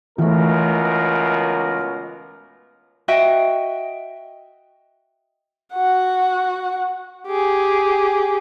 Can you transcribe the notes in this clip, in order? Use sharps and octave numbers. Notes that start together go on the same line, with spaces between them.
C#2 B2 E3 A3 A#4
F#4 D#5 E5 G5
F#4 F#5
G4 G#4